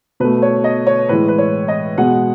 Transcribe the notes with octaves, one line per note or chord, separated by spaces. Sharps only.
B2 A3 B4
C#5
D#5
C#5
A2 E3 G#3 B4
B4
C#5
D#5
B2 G#3 F#5